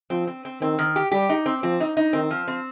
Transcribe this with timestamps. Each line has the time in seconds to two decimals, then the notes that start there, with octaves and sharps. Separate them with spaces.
0.10 F3 C4
0.27 C4
0.45 C4
0.61 D#3 C4
0.79 D#3
0.96 G4
1.12 G3 G4
1.29 D#4
1.46 C4
1.63 F3 C4
1.80 D#4
1.97 D#4
2.13 D#3 C4
2.31 F3
2.48 C4